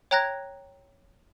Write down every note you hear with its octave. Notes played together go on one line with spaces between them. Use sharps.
C#5 G5 A#5 F#6 G#6 A#6